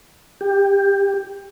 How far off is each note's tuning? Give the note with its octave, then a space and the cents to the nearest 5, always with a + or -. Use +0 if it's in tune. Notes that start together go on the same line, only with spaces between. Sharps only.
G4 +20